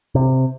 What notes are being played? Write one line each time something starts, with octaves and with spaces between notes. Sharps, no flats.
C3